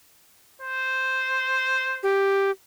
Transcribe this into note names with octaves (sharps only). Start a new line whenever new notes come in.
C5
G4